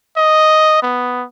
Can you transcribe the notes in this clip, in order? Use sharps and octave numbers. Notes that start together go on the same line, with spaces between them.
D#5
B3